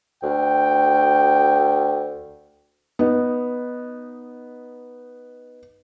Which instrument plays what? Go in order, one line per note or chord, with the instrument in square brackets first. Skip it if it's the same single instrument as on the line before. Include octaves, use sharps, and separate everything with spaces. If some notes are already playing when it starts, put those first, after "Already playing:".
[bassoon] D2 [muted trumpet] G5
[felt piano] B3 D#4